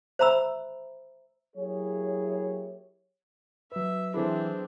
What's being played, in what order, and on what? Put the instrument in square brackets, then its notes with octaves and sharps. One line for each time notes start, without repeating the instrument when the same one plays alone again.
[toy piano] C5 E5 A#5 B5 E6
[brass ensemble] F#3 A#3 E4 G4 G#4 C#5
[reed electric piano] F#3 B4 [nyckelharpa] E5
[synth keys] E3 E4 [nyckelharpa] C4 D4 [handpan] G#4 A4 C5